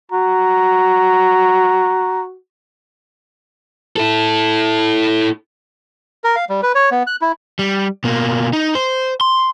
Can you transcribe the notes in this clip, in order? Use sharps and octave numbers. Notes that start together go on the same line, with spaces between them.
F#4 A#5
E4 A4
A#4
F5
G3
B4
C#5
B3
F#6
E4
G3
B2 A#3
D#4
C5
C6